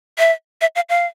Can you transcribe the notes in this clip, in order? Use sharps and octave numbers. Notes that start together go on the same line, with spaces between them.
E5
E5
F5
F5